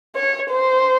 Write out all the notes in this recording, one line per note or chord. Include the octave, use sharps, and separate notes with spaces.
C#5
C5